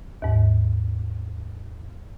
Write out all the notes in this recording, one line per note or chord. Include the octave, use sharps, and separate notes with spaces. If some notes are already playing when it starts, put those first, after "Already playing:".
D#2 G#2